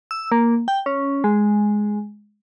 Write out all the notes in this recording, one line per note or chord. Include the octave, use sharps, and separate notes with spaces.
E6
A#3
G5
C#4
G#3